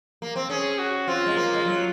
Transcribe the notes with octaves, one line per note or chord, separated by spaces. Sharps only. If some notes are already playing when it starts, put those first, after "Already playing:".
A#3
C4
C#4 G#4
F#4
C4 F4
G#3
A#3
G#3
F#3